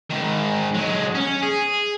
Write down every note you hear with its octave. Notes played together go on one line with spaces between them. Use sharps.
G#2 D#3
F#3 G#3
C#4
G#4